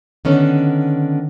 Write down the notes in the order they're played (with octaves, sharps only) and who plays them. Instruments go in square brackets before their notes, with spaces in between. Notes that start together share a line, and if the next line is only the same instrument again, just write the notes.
[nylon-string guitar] D3 D#3 B3 C#4